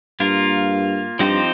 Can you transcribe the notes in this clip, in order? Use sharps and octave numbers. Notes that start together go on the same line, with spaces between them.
G2 A#3 F4 A#4
G2 F3 C4 D#4 G4 C5